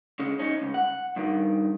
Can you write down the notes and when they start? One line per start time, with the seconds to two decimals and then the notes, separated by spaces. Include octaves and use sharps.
0.19 C#3 G#3 C#4
0.39 C#4 D#4
0.62 C#2
0.74 F#5
1.16 G2 D#3